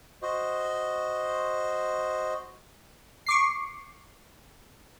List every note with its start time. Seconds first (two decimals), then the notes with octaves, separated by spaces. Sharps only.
0.22 F#4 C5 D#5
3.26 C#6 D6 C7